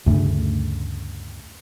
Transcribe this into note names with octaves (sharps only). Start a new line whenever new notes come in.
D2 G2 C#3 A3